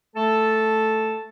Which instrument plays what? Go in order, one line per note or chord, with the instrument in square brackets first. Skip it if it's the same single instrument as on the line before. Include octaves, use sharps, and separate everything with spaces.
[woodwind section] A3 A4 A5